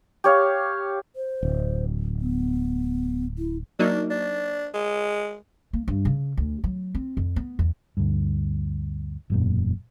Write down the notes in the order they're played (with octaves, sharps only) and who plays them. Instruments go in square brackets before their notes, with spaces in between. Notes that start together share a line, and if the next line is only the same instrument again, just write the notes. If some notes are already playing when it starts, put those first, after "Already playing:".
[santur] G4 C#5 F5
[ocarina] C5
[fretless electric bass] D1
[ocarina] B3
E4
[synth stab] F#3 A#3 D#4 [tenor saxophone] D4
[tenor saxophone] D4
G#3
[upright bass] A#3
G2
C#3
D2
F#3
C4
F2
B3
E2
[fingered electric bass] D2 G2
E1 F#2 A#2